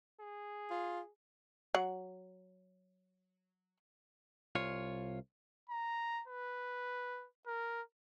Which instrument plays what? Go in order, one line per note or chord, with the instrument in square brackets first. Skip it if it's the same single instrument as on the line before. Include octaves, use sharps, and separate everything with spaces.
[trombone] G#4
[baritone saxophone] F4
[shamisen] F#3 F#5
[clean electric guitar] C2 F4 C#5
[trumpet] A#5
B4
A#4